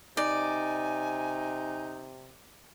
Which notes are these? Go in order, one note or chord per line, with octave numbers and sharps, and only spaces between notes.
C3 D#4 D5 G#5